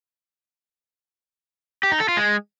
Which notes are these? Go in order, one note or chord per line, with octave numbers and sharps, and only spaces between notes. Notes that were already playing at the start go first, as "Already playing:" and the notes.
G4
D#4
A4
F4
G#3